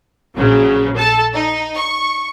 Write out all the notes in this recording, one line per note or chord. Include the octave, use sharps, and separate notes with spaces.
A#1 C#3 F#3
A4 A5
D#4
C#6